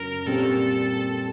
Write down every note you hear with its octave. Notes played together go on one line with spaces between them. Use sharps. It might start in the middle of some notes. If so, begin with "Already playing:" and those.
Already playing: F#2 C#3 F#3 A#4
A#2 G3 C4 A4